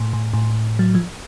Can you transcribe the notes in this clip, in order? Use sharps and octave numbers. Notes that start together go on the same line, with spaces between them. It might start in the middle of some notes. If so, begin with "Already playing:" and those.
Already playing: A2
A2
A2
F#3
F3